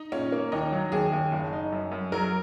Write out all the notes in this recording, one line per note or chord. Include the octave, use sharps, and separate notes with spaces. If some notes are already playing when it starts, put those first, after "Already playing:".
Already playing: D#4
A#2 C#4
A#3
D#2 D#4
F#3
D#2 G#4
D#2
F#1
D#4
F#2
F#2
F#3 A#4